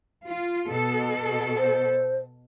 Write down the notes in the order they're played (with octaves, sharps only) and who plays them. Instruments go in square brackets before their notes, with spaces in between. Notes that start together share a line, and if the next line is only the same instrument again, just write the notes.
[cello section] F4
B2 A4
[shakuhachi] C5